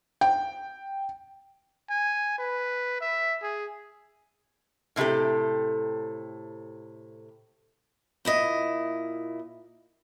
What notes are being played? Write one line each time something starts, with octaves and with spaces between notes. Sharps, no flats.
G5
G#5
B4
E5
G#4
A2 C3 D#4 G4 A4
A#2 E4 D#5